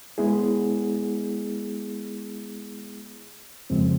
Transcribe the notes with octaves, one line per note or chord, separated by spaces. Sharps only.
G#3 B3 E4 G#4
F2 C#3 F3 G#3 C4